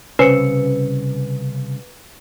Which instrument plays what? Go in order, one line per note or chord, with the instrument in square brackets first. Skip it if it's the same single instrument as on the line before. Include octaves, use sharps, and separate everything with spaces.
[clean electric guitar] C2 C#3 [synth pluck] C#4 C5 [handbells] B4 C#7